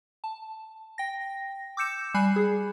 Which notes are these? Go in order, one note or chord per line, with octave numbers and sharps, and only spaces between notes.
A5
G5 A#6
D6 E6 G6 C#7 E7
G3 G#5 B5 F#6 C7
G#4